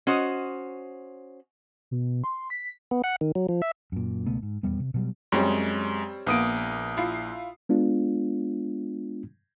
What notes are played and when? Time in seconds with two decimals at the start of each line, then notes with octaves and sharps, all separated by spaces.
0.07 C#4 F#4 C5 D#5
1.91 B2
2.24 C6
2.50 B6
2.91 B3
3.04 F#5
3.21 D#3
3.35 F#3
3.49 F3
3.62 E5
3.92 F#2 A#2
4.26 C#2 B2 A3 B3
4.42 G#2
4.63 D#1 E2 G3 B3
4.80 C3
4.94 B2 F#3 G3
5.32 F#2 G3 G#3 C4 C#5
6.27 A#1 A#3 B3 D#6 D7
6.97 E4 F4 C7
7.69 G#3 B3 D4 F4